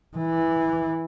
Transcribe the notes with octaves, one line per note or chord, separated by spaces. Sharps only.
E3